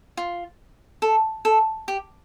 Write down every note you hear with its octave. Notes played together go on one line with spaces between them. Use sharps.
F4
A4
A4
G4